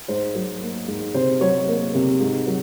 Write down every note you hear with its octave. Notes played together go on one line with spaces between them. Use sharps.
G#2 C5
F#3
A#3
G#2
C3 C5
F#3 C#5
A#3
C3
G#2
F#3